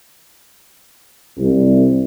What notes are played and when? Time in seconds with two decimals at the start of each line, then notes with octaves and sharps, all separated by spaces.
1.38 C2